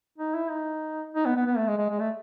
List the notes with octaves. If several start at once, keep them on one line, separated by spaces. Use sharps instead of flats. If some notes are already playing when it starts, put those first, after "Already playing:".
D#4
E4
D#4
D#4
B3
B3
B3
A3
G#3
G#3
G#3
A3